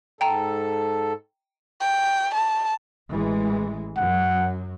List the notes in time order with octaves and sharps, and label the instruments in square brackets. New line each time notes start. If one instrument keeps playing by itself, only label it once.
[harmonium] G#2 A4 [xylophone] G5 A#5
[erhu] G5
A5
[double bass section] A1 E3 G#3
[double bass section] F#2 F#3 [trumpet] F#5